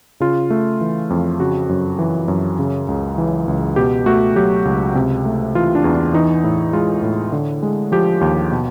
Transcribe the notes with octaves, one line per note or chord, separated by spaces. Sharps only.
C#3 F4
A3
E3
F2
C#3 F#4
F#2
E3
F#2
C#3
C#2
E3
C#2
B2 G4
A3 F#4
F#3 G4
C#2
C3
A3
E3 F4
D4
E2
D4
E3 D#4
A2 E4
G#3 F4
A2
D3
G#3
F3 G4
D#2
B2